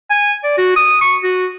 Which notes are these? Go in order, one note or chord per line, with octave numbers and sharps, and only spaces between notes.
G#5
D5
F#4
D#6
C#6
F#4